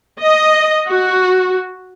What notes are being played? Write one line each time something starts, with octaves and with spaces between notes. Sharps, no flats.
D#5
F#4